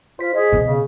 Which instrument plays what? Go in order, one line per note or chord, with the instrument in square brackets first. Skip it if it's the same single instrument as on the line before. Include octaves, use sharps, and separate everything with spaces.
[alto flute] F4 [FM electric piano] C5 B6
[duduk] G#4 [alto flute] D#5
[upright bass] B2
[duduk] C#3